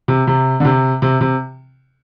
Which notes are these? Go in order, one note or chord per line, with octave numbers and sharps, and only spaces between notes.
C3
C3
D3
C3
C3
C3